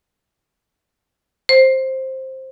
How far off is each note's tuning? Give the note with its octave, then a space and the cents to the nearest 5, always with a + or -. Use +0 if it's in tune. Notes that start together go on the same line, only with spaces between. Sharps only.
C5 +10